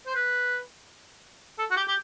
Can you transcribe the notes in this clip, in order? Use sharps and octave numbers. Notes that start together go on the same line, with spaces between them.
C5
B4
A4
F#4
G4
G4